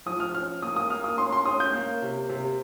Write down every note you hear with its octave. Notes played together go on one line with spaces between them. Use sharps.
F3 D#6
F6
C#4 F6
A#3 D#6
D#6
A#3 F6
D#6
C#4 C6
C6
C#4 D#6
G6
A#3
C3
C3